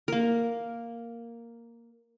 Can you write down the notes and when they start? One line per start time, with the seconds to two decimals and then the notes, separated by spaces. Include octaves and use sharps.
0.08 A#3 A#4